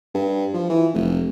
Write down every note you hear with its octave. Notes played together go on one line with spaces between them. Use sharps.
G2
F3
E3
F1